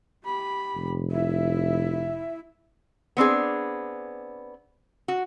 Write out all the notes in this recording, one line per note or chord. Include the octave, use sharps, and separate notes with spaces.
G4 B5
F1
E4 E5
B3 C4 D4 G#4
F#4